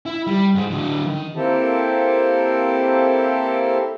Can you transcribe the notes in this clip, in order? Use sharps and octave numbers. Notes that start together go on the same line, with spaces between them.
E4
G3
G#2 G#3
D3 F#3
D#3
A#3 C4 E4 G4 A4